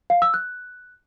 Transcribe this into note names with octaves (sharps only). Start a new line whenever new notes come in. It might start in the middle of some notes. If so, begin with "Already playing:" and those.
F5
E6
F#6